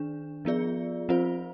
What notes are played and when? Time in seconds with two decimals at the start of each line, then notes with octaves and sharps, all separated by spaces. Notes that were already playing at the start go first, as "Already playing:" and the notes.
Already playing: D#3 D4
0.45 F3 B3 F4 G#4 D5
1.09 F3 C4 F4 C5